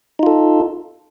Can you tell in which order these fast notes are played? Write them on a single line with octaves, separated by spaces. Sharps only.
D#4 F4 A4